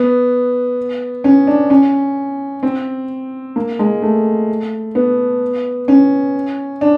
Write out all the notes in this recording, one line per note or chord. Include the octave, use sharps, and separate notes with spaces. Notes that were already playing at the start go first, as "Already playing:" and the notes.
Already playing: B3
C#4
D4
C#4
C4
A#3
G#3
A3
B3
C#4
D4